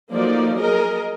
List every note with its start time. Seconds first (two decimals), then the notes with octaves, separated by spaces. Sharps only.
0.13 F3 F#3 A3 A#3 D#4 D5
0.60 G#4 A#4 D#5